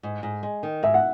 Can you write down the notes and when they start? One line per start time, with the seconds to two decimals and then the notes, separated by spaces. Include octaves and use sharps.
0.03 G#2
0.23 G#2
0.43 G#3
0.63 D#3
0.83 G#2 E5
0.94 F#5